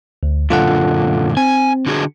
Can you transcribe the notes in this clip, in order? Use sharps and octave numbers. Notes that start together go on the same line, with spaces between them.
D2
F#2 A#2 D3 F4 A4 F#5
C4 G#5
D3 F#4 G#4